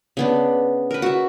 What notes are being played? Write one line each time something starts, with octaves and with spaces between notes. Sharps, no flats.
C#3 B3 D4
A#4 B4
F#4 E5